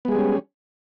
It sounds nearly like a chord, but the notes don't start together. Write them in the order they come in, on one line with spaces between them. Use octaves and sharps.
B3 G#3 G#4 G3 C#4